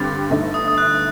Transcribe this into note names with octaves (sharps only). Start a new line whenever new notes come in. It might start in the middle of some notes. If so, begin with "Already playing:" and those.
Already playing: G2 D3 C4 G4 A6
G1 G2 D3 A3 D#4
D#6
D#6
F#6